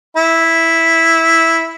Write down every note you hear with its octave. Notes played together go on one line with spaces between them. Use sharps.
E4